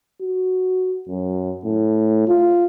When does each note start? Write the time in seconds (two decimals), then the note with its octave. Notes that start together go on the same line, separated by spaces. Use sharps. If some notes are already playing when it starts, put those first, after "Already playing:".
0.21 F#4
1.09 F#2
1.65 A2
2.28 F4